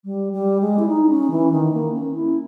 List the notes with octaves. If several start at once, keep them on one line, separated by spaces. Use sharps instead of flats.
G3
G3
G#3
E4
D#4
C#4
E3
D#3
A#3
C#4
E4